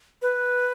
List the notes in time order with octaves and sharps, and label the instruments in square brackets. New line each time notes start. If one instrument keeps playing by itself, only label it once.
[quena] B4